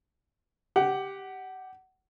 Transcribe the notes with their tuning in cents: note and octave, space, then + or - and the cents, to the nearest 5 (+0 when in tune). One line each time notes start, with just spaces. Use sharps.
G4 +0 F#5 +20